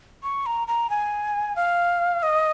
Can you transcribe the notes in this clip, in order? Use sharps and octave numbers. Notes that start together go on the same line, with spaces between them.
C#6
A#5
A#5
G#5
F5
D#5